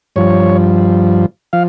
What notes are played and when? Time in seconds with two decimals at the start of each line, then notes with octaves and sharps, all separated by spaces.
0.16 G2 F3 C#5
1.53 F3 F5